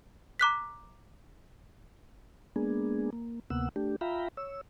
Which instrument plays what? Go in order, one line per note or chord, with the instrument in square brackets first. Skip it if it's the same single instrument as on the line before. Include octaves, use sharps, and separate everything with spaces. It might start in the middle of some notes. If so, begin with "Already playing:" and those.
[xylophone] A#5 D6 F#6 B6
[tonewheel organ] G#3 A#3 B3 D4 G#4
A#3
D2 C3 A#3 B3 F#5 E6
A3 D4 G4
F4 E5 F5 G5 A#5 B5
C#5 E6